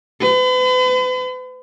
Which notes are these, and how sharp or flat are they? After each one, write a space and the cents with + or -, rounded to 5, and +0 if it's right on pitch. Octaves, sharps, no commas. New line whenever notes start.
B4 +40